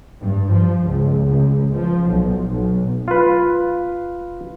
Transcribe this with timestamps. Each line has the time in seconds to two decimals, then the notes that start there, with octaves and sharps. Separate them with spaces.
0.19 G2
0.51 F3
0.86 C#2
1.27 C#2
1.72 F3
2.08 B1
2.53 B1
3.08 F4 B4